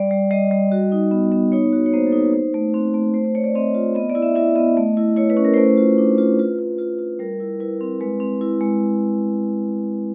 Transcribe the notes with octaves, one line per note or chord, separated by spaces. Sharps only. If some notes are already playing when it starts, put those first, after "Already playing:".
Already playing: G3 D5
G3
G3 D#5
G3
F#4
D#4
B3
B3
D#4 C#5
F#4
C#5
A#3 C5
A4
D#4
B4
D#4 C5
A3
C4
A3
A3 C5
C5
A3 C#5
D5
C4 D#5
F4
B3 D#5
D5
E4
E5
E4 E5
B3 D#5
A3
E4
E4 C#5
B4
C#4
A#4
C5
A3 B4
F4
D4
F4
F4
F4
F4
F4
G3 A#4
E4
E4 B4
C4
G#3 B4
C4
E4
G#3